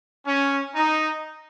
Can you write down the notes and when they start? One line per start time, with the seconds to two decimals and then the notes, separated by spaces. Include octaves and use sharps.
0.26 C#4
0.75 D#4